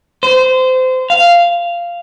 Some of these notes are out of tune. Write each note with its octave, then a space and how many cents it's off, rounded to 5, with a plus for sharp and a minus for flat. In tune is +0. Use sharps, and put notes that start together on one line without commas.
C5 -25
F5 -10